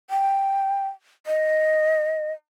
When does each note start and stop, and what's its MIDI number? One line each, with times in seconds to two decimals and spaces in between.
0.10 0.88 79
1.27 2.32 75